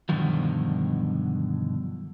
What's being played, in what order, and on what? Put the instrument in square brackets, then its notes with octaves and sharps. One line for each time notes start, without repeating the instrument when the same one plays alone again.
[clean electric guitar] G2 B2 D3 D#3 F3 F#3